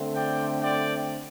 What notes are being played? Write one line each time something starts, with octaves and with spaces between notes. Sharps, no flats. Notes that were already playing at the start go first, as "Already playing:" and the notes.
Already playing: D3 A3 C4
D5 G5
D5 G5